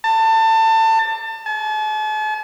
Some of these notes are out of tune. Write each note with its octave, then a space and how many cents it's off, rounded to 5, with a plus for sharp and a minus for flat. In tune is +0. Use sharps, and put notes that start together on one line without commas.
A5 +25
A5 -45